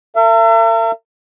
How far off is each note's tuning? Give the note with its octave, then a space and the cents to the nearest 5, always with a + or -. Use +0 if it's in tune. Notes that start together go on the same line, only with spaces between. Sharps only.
A#4 -45 E5 +40